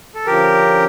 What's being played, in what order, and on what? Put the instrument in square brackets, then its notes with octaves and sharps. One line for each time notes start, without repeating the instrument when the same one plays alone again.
[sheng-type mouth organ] A4
[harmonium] D3 F3 C#4 F4 [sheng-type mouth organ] G4 A#4